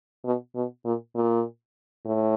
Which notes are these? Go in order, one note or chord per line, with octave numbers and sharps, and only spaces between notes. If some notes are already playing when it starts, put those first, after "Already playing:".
B2
B2
A#2
A#2
A2